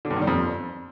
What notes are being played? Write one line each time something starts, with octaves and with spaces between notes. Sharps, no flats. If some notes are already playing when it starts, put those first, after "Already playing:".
D3
G2
D#3
G3
F2